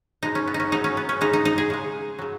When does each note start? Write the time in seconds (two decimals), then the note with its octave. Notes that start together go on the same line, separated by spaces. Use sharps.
0.23 B2 G#3 D#4
0.35 C#4
0.47 B3
0.54 D#4
0.60 C#4
0.72 C#3 F#3 D#4
0.84 C#4
0.97 B3
1.09 C#4
1.21 C#3 G#3 D#4
1.33 D#4
1.45 D#4
1.58 G#4
1.70 C#3 G#3
2.19 C#3 F#3